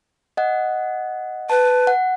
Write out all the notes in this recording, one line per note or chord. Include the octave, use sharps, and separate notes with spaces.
D#5 F#5
B4 A5
F#5